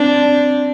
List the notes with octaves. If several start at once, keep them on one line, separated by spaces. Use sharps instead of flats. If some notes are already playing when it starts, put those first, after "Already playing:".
Already playing: C4 D4